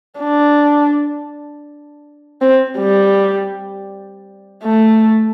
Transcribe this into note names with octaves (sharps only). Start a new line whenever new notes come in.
D4
C4
G3
A3